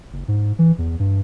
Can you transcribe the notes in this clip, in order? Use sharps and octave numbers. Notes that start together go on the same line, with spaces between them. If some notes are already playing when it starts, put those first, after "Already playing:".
F#1
G#2
E3
E2
G2